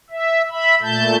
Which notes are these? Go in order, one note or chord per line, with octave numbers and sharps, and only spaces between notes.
E5
E5 B5
A#2 A3 A5 G6